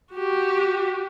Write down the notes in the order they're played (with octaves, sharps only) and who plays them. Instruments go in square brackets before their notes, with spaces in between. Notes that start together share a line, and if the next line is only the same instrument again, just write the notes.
[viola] F#4 G4